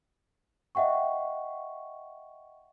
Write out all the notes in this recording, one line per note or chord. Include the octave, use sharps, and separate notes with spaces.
D#5 E5 F#5 G5 C#6